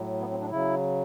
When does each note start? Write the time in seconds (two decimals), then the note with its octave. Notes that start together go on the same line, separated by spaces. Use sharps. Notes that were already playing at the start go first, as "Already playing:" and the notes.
Already playing: A2 F#3
0.20 B3
0.31 C4
0.41 D4
0.51 C#3 F#3 E4